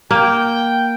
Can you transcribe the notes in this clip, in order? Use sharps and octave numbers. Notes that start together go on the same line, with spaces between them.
A#3 G5